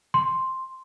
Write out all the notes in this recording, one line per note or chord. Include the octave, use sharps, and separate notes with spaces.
C6